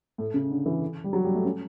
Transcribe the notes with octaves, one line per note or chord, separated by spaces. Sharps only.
A2
C#3
D3
E3
G3
F#3
G3
A3
C#4